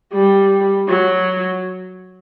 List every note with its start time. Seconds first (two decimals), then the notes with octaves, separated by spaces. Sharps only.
0.13 G3
0.88 F#3